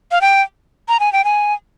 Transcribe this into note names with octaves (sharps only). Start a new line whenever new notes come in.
F5
G5
A#5
G#5
G5
G#5